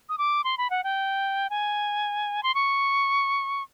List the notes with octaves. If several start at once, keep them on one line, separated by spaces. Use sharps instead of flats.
D#6
D6
C6
B5
F#5
G5
G#5
C6
C#6